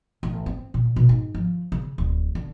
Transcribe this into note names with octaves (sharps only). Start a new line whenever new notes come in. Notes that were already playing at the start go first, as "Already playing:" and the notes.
A1
C4
A#2
B2
G#2
F3
C#3
D1
D3